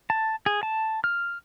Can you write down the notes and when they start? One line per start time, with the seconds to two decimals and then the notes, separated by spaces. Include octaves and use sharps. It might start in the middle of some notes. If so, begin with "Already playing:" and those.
0.10 A5
0.46 G#4
0.63 A5
1.04 F6